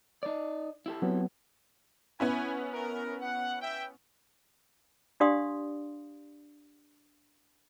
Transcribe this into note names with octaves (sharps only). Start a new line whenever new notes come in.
D#4 D5
E4 G4 A4
F#3 B3 C4
B3 C#4 E4 B4 G#5
A#4
F#5
E5 G5
D4 G4 D5 F5 C6 D#6